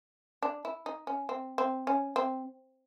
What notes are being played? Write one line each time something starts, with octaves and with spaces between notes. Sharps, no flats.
D4
E4
D#4
C#4
C4
C4
C#4
C4